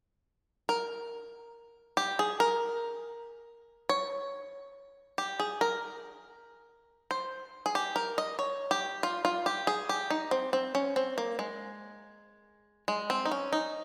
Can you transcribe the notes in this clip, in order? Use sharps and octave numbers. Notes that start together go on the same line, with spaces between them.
A#4
G4
G#4
A#4
C#5
G4
G#4
A#4
C5
G#4
G4
A#4
D#5
C#5
G4
F4
F4
G4
G#4
G4
D#4
C4
C4
C#4
C4
A#3
G#3
G#3
C4
D#4
C#4
D#4